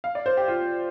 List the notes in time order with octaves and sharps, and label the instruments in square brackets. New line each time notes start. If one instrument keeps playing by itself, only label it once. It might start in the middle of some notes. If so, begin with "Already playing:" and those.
[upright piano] F5
D5
C5
G4
F4